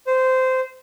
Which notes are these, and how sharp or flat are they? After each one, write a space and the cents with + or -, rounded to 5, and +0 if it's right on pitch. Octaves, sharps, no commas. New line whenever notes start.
C5 -15